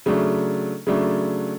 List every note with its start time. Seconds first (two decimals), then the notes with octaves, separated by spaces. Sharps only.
0.06 C#3 F#3 A3 D4
0.87 C#3 F#3 A3 D4